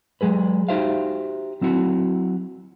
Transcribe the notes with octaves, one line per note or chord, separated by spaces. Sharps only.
F#3 G#3 G#4 B4
D#4 F#4 G4 C5 E5 F5
F#3 C4 E4 F#4